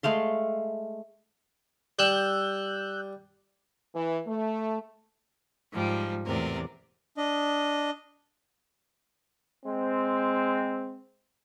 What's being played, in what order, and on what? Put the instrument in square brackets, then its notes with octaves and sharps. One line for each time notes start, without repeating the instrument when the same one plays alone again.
[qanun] G#3 A3 F5 C6
[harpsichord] G3 [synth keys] E6 F#6 G6
[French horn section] E3
A3
[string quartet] G#2 F3 G3
E2 A2 C3 A#4 D5
[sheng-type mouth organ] D4 D#5
[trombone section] G#3 C4